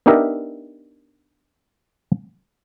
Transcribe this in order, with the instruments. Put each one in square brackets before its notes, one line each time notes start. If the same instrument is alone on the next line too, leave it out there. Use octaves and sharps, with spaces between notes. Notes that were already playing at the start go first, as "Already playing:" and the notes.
[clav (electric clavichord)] B3 D4 D#4 G4 A#4 E5